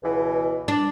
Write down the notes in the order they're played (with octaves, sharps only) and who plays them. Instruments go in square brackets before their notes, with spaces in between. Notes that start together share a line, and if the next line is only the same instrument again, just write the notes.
[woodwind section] C#2 B2 E3
[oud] D4